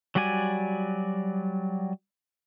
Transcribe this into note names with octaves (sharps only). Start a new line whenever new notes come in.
F#3 G3 F#4 D5 G#5